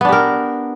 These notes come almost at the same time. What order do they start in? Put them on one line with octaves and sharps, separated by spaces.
B3 D4 G4 A#4